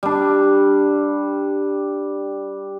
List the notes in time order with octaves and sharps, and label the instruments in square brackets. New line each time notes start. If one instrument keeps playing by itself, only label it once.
[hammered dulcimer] G3 D4